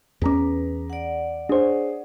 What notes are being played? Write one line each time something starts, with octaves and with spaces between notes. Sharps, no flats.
E2 C#4 G#4 B4 A#5 D6
D5 F#5
D4 G#4 C5 C#5